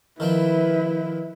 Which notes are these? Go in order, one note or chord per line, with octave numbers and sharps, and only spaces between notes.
D#3 F3 C4 E4 B4